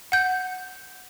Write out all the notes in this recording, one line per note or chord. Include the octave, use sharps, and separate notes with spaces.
F#5 G6